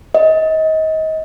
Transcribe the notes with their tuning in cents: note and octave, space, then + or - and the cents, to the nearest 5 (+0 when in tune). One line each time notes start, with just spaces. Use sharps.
D#5 +30